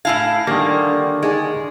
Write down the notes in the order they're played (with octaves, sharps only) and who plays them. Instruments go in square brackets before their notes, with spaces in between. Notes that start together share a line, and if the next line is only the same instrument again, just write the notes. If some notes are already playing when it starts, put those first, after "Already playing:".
[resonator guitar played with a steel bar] A2 E4 F5 [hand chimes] G#5 A5 G#6
[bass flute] D3 [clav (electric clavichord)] D#3 A#3 [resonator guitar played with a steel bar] G3
[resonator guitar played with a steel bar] G#3 [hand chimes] D#4 G#5